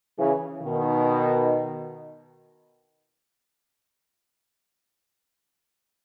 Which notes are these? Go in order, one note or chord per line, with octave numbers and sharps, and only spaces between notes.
C#3 E3
B2 D#3